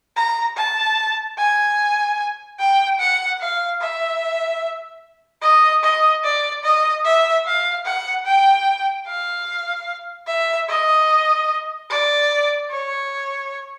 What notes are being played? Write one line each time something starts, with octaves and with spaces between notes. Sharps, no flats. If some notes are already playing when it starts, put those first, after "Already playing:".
A#5
A5
G#5
G5
F#5
F5
E5
D#5
D#5
D5
D#5
E5
F5
F#5
G5
F5
E5
D#5
D5
C#5